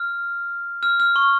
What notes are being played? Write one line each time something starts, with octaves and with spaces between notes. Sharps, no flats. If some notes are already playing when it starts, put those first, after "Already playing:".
Already playing: F6
F6
F6
C#6